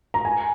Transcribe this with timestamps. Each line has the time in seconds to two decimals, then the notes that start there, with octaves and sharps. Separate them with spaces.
0.14 A#5
0.25 G#5